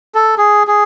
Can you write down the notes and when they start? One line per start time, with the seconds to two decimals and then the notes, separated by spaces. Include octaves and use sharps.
0.15 A4
0.38 G#4
0.67 G#4